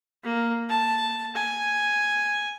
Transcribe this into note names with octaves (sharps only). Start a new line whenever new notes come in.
A#3
A5
G#5